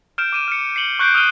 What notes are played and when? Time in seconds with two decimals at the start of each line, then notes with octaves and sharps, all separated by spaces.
0.18 F6 G6 D7 E7
0.32 D6 D#7 E7
0.48 F6 C#7
0.76 C7 C#7 F#7 G7
0.99 C#6 F#6 G6 C7 D7
1.14 D#6 F6 C7 D#7 G7